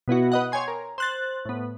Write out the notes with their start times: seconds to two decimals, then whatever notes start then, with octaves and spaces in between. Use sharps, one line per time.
0.08 B2 B3 E4 F#4
0.32 B4 D#5 F#5
0.52 C#5 G5 G#5 C6
0.68 A#4
0.98 C5 F#6 A6
1.45 A2 B3